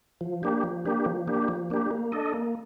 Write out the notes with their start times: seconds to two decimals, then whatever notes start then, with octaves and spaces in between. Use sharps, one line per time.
0.21 F3
0.43 A#3 D4 G4
0.64 F3
0.86 A#3 D4 G4
1.06 F3
1.28 A#3 D4 G4
1.48 F3
1.70 A#3 D4 G4
1.91 A#3
2.12 D4 A4 D#5
2.34 A#3